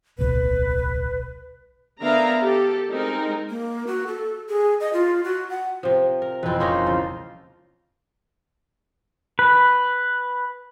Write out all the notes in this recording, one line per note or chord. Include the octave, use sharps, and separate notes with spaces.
D1 B1 B4
D3 B3 A#4 E5 F5 A#5
G4 A4
G#3 C4 D#4 A#4
A#3
F#4
A4
G#4
D#5
F4
F#4
F#5
C3 F3
A#4
E1 F2 C4 B4
A#3 C#4 D#4 C6 G6 A#6
C#2 F4
B4